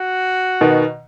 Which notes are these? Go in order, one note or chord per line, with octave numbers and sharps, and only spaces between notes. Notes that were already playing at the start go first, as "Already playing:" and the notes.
Already playing: F#4
B2 D#3